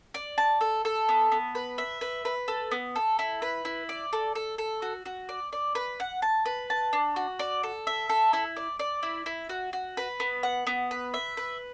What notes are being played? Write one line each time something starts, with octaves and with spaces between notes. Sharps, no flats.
D5
A5
A4
A4
B3
B3
B4
E5
B4
B4
A4
B3
A4
E4
B4
E4
D5
A4
A4
A4
F#4
F#4
D5
D5
B4
F#5
A5
B4
A5
D4
F#4
D5
A4
E5
A4
E4
D5
D5
E4
E4
F#4
F#4
B4
B3
F#5
B3
B4
E5
B4